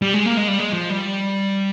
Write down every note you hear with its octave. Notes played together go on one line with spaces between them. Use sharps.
G3
G#3
A#3
G#3
G3
G#3
F3
G3